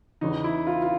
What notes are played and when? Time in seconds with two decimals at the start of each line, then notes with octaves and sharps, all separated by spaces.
0.21 E2 C#3 E3 D#4
0.44 E4
0.67 F4
0.82 F4